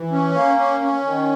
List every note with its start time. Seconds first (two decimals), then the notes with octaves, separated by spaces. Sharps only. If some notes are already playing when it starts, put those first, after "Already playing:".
Already playing: E3
0.11 C#4
0.35 A#3
0.57 C#4
0.81 C#4
1.04 D#3